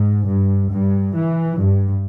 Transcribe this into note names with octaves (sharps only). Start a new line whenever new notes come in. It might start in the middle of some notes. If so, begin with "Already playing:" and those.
Already playing: G#2
G2
G2
E3
G2